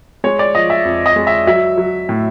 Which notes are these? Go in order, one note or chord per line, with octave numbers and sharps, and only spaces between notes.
G#3 C#5
D5
F3 D#5
E5
F2
D#5
G#3
E5
F#3 E5
F#3
A2